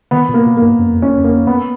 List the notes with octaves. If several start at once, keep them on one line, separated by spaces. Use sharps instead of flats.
D#3 B3
A#2
A#3
A#2
A#3
G#2
F#2
F2
C#4
F2
A#3
B3